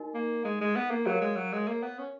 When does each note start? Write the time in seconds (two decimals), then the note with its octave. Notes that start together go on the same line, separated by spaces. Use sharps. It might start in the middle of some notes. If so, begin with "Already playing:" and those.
Already playing: D#4 F#4 A#4 D#5 G#5
0.14 A#3
0.45 G#3
0.61 G#3
0.76 B3
0.91 A#3
1.06 F#3 F#4 A#4 C#5 F5
1.21 G#3
1.36 F#3
1.53 G#3
1.68 A#3
1.83 B3
1.99 C#4